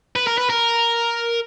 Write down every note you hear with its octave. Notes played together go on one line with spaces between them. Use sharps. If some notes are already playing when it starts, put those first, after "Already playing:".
B4
A#4
B4
A#4